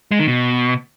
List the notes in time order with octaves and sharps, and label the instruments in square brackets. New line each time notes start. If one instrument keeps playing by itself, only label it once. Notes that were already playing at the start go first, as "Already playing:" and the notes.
[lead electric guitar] G#3
D#3
B2